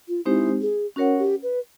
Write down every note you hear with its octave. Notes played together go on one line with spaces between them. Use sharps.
F4
G#3 C4 D#4 E4 G4 C5
G#4
C#4 F#4 A#4 C#5 F#5
G4
B4